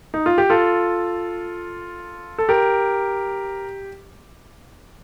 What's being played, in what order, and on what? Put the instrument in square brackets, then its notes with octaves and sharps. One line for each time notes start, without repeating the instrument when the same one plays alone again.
[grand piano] D#4
F4
G4
F4 A4
A4
G4 A#4